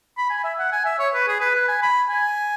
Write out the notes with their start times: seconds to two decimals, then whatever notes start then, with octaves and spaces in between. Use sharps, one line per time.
0.17 B5
0.30 G#5
0.44 E5
0.59 F#5
0.72 G#5
0.85 E5
0.99 C#5
1.14 B4
1.28 G#4
1.41 B4
1.55 B4
1.68 G#5
1.83 B5
2.10 G#5